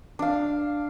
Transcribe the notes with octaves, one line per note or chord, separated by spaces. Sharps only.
D4 F5